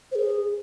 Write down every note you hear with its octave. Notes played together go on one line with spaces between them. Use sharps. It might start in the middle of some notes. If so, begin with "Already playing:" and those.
C5
G#4